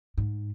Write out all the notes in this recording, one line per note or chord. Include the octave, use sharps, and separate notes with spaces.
G#2